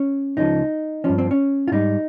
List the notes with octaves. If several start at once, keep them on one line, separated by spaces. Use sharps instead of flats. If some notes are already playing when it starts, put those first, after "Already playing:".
Already playing: C#4
C#2 C#3 F3 D#4
G2 F3 C#4
C4
C#4
F4
G#2 G3 D#4